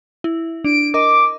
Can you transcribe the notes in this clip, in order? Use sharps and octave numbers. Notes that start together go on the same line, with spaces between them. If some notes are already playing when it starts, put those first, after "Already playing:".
E4
D4 D7
A#4 D#5 D6